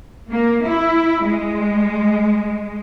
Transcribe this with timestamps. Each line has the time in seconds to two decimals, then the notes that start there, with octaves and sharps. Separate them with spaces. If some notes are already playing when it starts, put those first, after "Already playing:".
0.30 A#3
0.65 E4
1.23 G#3